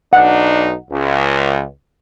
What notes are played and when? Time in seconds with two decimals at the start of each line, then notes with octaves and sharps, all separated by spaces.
0.13 B1 D4 D#4 F#5
0.91 C#2